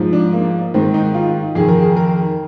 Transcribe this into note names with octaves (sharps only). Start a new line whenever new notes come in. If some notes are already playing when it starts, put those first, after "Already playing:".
Already playing: G#2 F3
D4
A#3
G#2 D#3 C4
D#4
F4
F2 D#3 G#4
A#4
G#4
A#4